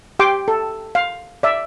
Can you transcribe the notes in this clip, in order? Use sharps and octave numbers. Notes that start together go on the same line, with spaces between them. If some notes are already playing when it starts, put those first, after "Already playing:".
G4 G5 C6 D6
A4
F5
D5 E5